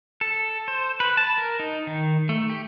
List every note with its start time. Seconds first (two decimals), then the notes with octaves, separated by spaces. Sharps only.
0.21 A4
0.68 C5
1.00 B4
1.17 A5
1.38 A#4
1.60 D#4
1.87 D#3
2.29 A3
2.50 G4